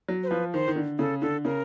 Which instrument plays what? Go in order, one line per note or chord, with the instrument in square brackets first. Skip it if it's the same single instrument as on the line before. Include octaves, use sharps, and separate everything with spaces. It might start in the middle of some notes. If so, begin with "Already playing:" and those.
[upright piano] F#3
[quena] C5
[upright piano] F3 [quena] B4
[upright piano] D#3 [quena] C5
[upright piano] D#3
D3
[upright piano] C#3 [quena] A4
[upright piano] D3 [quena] A4
[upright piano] C#3 [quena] A#4